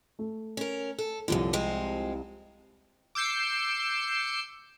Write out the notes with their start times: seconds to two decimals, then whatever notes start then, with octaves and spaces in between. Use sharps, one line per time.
0.19 A3
0.57 C#4 A#4
0.99 A4
1.28 C2 F#2 A#2 D3 F3
1.53 G#3 C4 F4
3.15 D6 E6 G6 C7 C#7